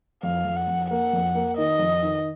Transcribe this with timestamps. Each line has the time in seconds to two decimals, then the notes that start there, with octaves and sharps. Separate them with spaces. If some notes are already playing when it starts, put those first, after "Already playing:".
0.23 F2 F5
0.45 F2
0.56 F#5
0.68 F2
0.90 A#3 F#5
1.13 F2
1.35 A#3
1.57 D#3 D#5
1.79 F2
2.03 D#3